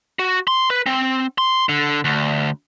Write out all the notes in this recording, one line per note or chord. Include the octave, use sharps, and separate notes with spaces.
F#4
C6
B4
C4
C6
D3
D2